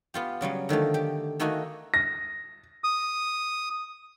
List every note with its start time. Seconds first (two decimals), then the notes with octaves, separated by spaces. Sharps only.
0.14 B3 F4 G4
0.41 C#3 F#3 G3 C#4
0.69 D3 D#3 F3 A3
0.94 G4
1.40 D#3 A3 A#3 D#4 F#4 G#5
1.94 A#6
2.84 D#6